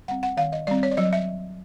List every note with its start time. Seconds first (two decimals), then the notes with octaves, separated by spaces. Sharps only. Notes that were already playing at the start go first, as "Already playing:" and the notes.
0.08 G3 C4 F#5
0.23 F#5
0.37 D#3 F5
0.52 D#5
0.67 G3 C4 D5
0.83 C#5
0.91 D5
0.97 F#3 D#5
1.13 E5